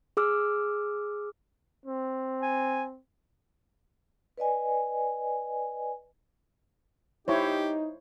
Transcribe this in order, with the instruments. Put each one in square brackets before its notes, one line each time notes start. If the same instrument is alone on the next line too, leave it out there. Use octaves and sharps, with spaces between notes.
[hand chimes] G#4 D6 E6 F6
[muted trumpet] C4
[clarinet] G#5
[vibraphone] B4 D5 D#5 G#5
[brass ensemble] D#4 [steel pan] E4 C5 C#5 [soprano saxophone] G4